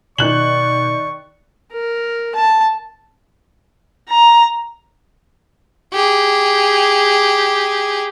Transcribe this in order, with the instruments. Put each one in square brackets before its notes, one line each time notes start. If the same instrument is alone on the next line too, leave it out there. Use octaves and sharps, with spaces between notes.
[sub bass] B2 [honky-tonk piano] D#3 F#6 F#7 [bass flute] D5 [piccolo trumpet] C#6
[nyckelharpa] A#4
A5
[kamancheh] A#5
[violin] G4 G#4